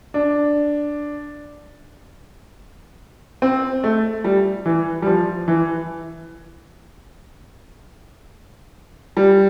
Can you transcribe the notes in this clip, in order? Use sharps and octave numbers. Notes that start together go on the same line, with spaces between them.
D4
C4
A3
G3
E3
G3
F3
E3
G3